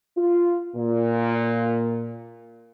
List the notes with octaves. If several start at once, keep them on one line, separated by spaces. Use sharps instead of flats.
F4
A#2